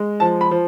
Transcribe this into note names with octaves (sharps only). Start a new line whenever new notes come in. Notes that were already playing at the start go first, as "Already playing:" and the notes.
Already playing: G#3
F3 A5
B5
F3